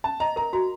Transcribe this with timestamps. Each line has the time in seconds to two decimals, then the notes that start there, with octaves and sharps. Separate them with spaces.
0.04 C#4 A5
0.20 D#5 A#5
0.36 A#4 A#5
0.53 F#4 A#5